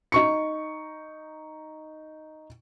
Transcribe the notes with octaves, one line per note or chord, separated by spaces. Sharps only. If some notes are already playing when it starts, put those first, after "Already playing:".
D#4 C#6 C#7